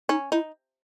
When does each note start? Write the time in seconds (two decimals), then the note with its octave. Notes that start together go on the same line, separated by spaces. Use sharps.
0.09 C#4 D#4
0.32 D#4 E4